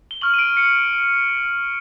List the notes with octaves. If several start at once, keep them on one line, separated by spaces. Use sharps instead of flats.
G7
C#6 F6 F#7
D#7
D7
C#7